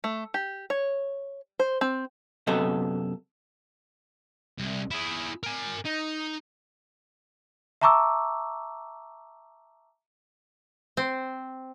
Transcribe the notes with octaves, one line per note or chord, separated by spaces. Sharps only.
A3
G4
C#5
C5
C4
F#2 C3 B3 A4 D#5
C2
E4 G#4
A#4 G#5
D#4
E5 A5 A#5 C#6 D6 E6
C4